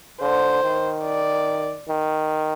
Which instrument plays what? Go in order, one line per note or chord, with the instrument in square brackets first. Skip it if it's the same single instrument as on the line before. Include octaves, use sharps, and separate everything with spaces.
[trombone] D3 [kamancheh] C5
[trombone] D#3
[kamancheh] D5
[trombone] D#3